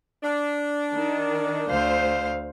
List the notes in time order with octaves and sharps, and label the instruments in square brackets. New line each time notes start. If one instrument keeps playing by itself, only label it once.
[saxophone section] D4
[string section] D#3
[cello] D2 F5 [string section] C5